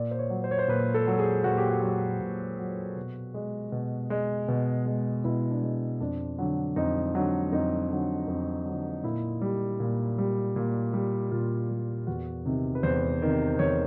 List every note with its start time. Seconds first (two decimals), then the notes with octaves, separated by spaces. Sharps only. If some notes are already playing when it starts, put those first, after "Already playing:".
Already playing: A#2 D5
0.11 C5
0.19 C#5
0.30 F#3
0.44 C5
0.51 C#5
0.59 C5
0.68 A#2 B4
0.94 A4
1.07 F#3
1.19 G#4
1.44 A#2 F#4
1.58 G4
1.70 F#4
1.82 F#3
2.21 A#2
2.59 F#3
2.96 B2
3.34 G#3
3.72 B2
4.10 G#3
4.48 B2
4.86 G#3
5.24 B2 E4
5.50 D4
5.62 G#3
6.00 F2 D4
6.38 D3 F#3
6.76 F2 D#4
7.14 D3 F#3
7.52 F2 D#4
7.90 D3 F#3
8.27 F2
8.65 D3 F#3
9.04 A#2 E4
9.41 G3
9.80 A#2
10.18 G3
10.56 A#2
10.93 G3
11.31 A#2 F4
11.69 G3
12.07 E2 F#4
12.46 C3 D#3
12.75 B4
12.83 E2 C5
13.22 C3 D#3
13.59 E2 C#5